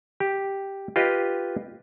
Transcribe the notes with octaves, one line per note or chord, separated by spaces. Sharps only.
G4
F4 G4 B4 D#5